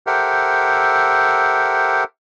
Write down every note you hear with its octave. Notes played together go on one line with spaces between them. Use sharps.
G4 A4 A#4 C5 E5 F#5